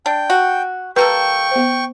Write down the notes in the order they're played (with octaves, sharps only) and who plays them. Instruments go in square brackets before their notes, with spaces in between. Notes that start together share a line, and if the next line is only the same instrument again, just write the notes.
[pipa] D4 [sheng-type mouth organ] G5
[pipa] F#4
[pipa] G3 A#3 A4 [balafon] B4 [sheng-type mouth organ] G5 C#6
[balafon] B3 C5